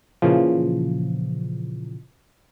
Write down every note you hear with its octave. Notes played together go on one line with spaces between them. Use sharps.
A#2 C#3 E3 F3